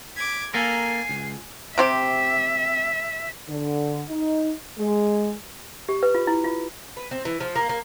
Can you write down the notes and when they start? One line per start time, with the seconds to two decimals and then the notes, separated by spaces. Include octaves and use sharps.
0.16 D6 G#6 B6
0.54 A#3 A4 A#4 G#5 C7
1.09 C#2
1.78 C3 C4 G4 E5
3.48 D3
4.09 D#4
4.78 G#3
5.89 G4
6.03 B4
6.15 F4
6.27 E4
6.44 F4
6.97 B4
7.11 C4
7.25 E3
7.40 F3
7.56 A#3
7.69 A#3